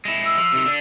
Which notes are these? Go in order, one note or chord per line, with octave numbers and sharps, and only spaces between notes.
G#3 E4
E6
F3
C3 D#3
D3 D4